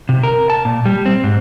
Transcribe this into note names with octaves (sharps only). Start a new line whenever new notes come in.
C3
A#4
A5
A#2
G3
C4
G#2